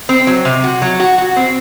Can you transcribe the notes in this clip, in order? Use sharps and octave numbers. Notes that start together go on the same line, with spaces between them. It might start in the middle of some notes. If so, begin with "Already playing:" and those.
C4
F#3
C3
F#4
F#3
F#4
F#4
C4